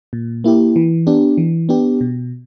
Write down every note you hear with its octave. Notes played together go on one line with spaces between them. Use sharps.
A#2
A#3 E4 G4
E3
B3 D4 G4
E3
B3 D4 G4
B2